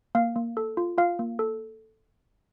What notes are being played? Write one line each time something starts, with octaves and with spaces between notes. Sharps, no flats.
A#3 F5
A#3
A4
F4
F4 F5
A#3
A4